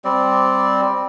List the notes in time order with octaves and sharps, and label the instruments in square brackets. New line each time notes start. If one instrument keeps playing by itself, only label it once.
[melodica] G3 C4 D5